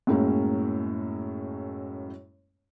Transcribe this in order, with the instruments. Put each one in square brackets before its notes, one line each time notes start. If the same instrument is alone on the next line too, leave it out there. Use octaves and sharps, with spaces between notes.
[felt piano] F#2 A2 G#3 A#3 C#4